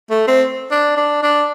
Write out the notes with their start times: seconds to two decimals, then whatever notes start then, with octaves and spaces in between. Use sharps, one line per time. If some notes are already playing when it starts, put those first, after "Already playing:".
0.10 A3
0.28 C4
0.71 D4
0.97 D4
1.23 D4